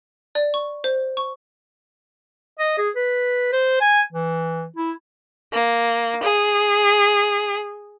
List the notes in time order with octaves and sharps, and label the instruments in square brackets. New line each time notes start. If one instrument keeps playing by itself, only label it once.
[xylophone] D5
C#6
C5
C#6
[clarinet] D#5
G#4
B4
C5
G#5
E3
E4
[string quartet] A#3
G#4